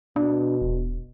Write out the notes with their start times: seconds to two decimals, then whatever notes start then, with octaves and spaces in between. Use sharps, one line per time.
0.16 B2 D4
0.62 D#1